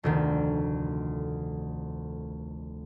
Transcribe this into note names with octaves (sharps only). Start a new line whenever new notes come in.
F1 D2 D#3